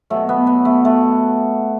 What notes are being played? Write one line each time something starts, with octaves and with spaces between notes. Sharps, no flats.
B2 F#3 A3
B3
B3
A3
A3